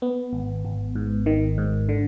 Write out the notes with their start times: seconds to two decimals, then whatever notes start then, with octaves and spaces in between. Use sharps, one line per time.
0.02 B3
0.33 G#1
0.65 G#1
0.95 G#2
1.26 D#3
1.58 G#2
1.89 D3